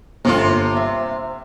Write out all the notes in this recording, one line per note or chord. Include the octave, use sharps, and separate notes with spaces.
G1 C3 A#3 F4
E5